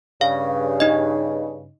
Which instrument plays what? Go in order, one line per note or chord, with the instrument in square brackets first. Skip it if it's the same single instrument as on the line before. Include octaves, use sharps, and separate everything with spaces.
[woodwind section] G2 C#3 [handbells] F5
[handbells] D#4 D#5